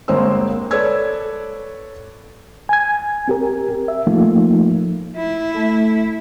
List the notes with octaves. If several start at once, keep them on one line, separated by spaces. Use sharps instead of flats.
G1 G#3 A#3 C4 C5 E6
A4 B4 C#5 D5 E6 G#6
G#5 G#6
C4 G4 A#4
E5
F3 A3 A#3 D#4 F4
E4
A3 A4